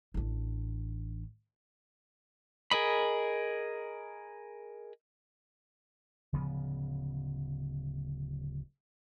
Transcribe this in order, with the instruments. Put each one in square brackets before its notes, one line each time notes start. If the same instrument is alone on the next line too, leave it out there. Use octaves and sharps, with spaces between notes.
[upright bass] A1 D4
[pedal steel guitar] G#4 A#4 D#5 B5
[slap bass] D1 C#3 F3 B3